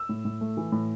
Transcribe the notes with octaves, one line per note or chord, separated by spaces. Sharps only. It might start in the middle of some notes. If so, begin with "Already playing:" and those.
Already playing: E6
A2
A2
A3
E3
A2